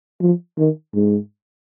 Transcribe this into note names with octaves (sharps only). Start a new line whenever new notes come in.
F3
D#3
G#2